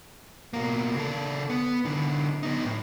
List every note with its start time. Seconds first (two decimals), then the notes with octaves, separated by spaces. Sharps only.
0.53 B2 A#3
0.96 C#3 A4
1.49 B3
1.85 D3 E3
2.43 B3 D#4
2.65 A2